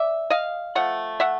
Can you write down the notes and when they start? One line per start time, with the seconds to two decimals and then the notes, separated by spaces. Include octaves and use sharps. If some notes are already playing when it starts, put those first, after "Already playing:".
Already playing: D5 E5
0.30 D#5 F5
0.75 F3 A3 F#5
1.20 E5 F#5